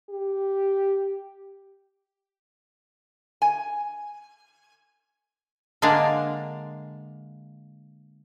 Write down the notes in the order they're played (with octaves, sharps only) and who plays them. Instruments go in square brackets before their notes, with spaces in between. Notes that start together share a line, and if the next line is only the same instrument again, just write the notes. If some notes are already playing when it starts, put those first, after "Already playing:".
[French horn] G4
[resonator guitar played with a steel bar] G#5
[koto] D3 G#3 A#3 D4 D5 F5